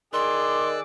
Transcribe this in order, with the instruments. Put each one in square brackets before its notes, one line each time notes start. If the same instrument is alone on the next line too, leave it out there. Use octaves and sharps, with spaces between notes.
[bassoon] D#3 [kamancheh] G#4 D6 [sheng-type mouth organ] D5 E6 F#6 [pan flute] C6